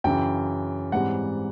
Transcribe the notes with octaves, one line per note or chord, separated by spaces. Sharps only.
F#2 C#3 E3 G5
G#2 E3 G3 C4 F#5